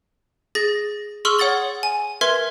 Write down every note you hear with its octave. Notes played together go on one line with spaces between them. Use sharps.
G#4 A6 A#6
G#4 C6 C#6 E6 F6
C#5 F#5 D#6 A6 G7
G#5
A#4 B4 E5 C6 G#6 G7